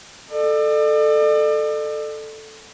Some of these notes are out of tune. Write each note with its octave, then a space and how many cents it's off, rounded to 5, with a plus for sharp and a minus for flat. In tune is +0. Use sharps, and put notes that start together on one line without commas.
A4 +0 D5 +40